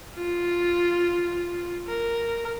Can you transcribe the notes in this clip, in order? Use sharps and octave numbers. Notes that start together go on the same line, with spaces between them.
F4
A#4